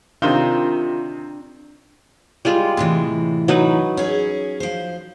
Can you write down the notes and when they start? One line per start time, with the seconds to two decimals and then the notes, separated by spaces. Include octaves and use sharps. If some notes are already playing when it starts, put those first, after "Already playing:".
0.22 C3 D#3 C4 D4 F4 A#4 A#5 G7
2.45 G3 G#3 F4
2.77 A2 C3 E3
3.48 F#3 D#4 B4
3.97 C#4 G#4
4.60 F3 C5